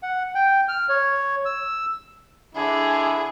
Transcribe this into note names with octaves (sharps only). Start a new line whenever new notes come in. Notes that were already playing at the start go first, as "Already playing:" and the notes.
F#5
G5
F6
C#5
E6
D3 E4 G#4